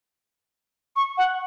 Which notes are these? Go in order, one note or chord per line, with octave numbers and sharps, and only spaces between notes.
C#6
F#5